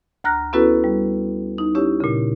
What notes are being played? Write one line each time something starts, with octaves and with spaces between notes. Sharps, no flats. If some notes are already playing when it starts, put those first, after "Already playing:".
D2 A#5 F6 F#6 A#6
B3 C#4 E4 F#4 A4 B4
G3
D#4
C#4 E4 G4 C#5
A#2 C#3